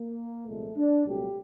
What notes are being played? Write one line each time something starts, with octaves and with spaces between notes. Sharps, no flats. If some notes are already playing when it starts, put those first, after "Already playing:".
Already playing: A#3
C2 A#2 F3 G#3 A3
D4
C2 A#2 F#3 A3 G4